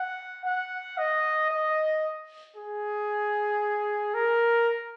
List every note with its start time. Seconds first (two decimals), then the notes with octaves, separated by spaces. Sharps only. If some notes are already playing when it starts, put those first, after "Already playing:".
Already playing: F#5
0.45 F#5
0.98 D#5
1.51 D#5
2.56 G#4
4.14 A#4